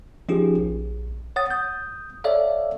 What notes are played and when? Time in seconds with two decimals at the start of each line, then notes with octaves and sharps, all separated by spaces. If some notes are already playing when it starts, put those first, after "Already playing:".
0.29 F3 C#4 D#4 F4 G4 G#4
0.58 A#1
1.36 C#5 F#5 D#6 A6
1.51 D#6 G6
2.24 A4 C#5 D5 E5 F5